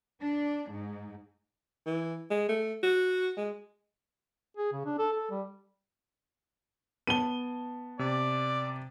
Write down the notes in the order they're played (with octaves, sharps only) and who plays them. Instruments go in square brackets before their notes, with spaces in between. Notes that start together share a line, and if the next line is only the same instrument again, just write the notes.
[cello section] D4
G#2
[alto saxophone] E3
G#3
A3
F#4
G#3
[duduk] G#4
C#3
D4
A4
A4
G3
[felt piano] B3 A5 [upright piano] D#7 G7
[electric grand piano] C3 [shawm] D5